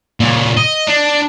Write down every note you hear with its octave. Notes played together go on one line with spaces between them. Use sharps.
A#2 C#3
D#5
D4